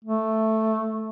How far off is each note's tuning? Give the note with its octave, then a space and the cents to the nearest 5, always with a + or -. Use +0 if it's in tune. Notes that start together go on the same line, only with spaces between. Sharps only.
A3 +0